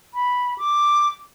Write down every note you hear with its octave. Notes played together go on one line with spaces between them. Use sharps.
B5
D6